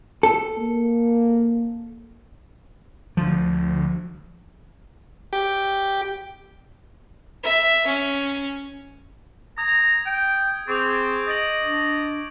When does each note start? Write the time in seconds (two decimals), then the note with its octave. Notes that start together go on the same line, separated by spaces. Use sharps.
0.23 A4
0.58 A#3
3.17 D2 F3
5.33 G4
7.43 E5
7.86 C#4
9.58 A#5 D#6 G#6
10.06 G5 D7
10.68 C4 G#4 C#6 D6 F7
10.90 G6 A6 D7
11.28 D#5 A6 D7 F#7
11.64 D4